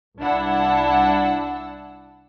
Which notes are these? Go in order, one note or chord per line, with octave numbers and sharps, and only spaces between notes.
C2 D4 E4 F#5 A5 E6